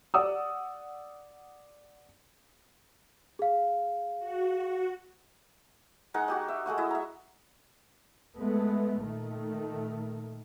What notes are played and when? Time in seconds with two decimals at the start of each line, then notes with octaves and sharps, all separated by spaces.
0.14 D5 F#5 D#6 E6
3.39 G#4 F5
4.19 F#4
6.14 G#3 D#4 A#4 F#5
6.28 F#4 G4 D#5
6.48 E5
6.66 G#3 A3 F#5 D#6
6.78 E4 D#5 E5
6.91 E5 A#5
8.38 G#3 A3 B3
9.04 A#2 D#3 A3